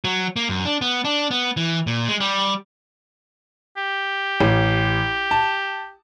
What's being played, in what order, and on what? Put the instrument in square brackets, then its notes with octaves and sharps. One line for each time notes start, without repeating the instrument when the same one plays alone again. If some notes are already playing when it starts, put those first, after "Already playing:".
[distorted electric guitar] F#3
A#3
F#2
D4
B3
D4
B3
E3
A#2
G#3
G3
[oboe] G4
[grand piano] A1
A5